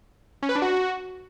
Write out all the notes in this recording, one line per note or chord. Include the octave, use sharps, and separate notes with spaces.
C#4
B4
D4
F#4